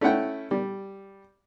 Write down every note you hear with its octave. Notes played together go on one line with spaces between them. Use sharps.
A3 C#4 E4 F#5 G5
G3